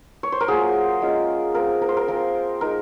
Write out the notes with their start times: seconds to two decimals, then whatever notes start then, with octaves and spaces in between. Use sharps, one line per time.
0.23 C#5
0.32 C5
0.41 A#4
0.48 F#3 A#3 F4 G#4
1.02 G#3 C#4 F4
1.54 F3 C4 F4 A#4
1.82 A#4
1.89 C5
1.97 A#4
2.08 F3 C4 F4 A#4
2.61 G#3 D#4 A#4